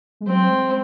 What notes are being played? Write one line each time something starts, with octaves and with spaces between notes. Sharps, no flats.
G#3
F#3 C4
G#3